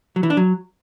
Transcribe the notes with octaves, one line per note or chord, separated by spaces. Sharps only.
F#3
E3
D4
F#3